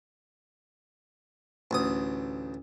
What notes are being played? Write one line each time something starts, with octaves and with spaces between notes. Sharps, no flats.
A1 D2 D#6